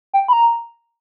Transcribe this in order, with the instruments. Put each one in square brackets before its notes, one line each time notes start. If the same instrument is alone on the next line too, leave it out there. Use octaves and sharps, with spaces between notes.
[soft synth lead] G5
B5
A#5